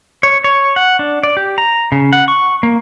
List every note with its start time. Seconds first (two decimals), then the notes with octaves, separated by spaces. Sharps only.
0.23 C#5
0.44 C#5
0.76 F#5
0.99 D4
1.23 D5
1.37 G4
1.58 A#5
1.92 C#3
2.13 F#5
2.28 C#6
2.63 A#3